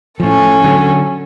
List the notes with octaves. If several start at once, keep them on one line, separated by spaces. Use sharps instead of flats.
A2 F3 C#4 A4
D3 F#3